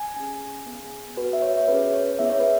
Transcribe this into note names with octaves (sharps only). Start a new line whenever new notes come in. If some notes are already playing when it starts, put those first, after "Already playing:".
Already playing: G#5
C#4 G#4
B3 G#4
B3 F#4 B4
E5
C#5
C#5
C#4 G#4 B4
C#5
B3 E4 G#4 E5
C#5
B4